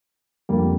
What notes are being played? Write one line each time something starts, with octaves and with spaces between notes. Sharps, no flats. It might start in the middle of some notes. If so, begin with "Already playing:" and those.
F2 D3 G3 A#3